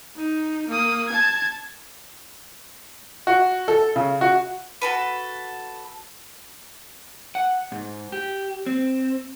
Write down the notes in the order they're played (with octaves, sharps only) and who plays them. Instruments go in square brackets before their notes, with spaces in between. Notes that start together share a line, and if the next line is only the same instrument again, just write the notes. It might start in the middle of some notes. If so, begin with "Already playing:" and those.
[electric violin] D#4
A#3 D#6
A5 G#6
[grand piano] F#4
A4
C#3
F#4
[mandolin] F#4 A4 B4
[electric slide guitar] F#5
G#2
G4
C4